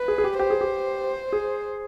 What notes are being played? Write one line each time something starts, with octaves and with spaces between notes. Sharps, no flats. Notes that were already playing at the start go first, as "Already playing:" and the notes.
Already playing: B4
G#4
G#4
G4
G4 C5
G#4
G4
G#4